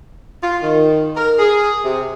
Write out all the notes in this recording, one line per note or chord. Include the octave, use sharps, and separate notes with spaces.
F4
D#3
A#4
G#4
C3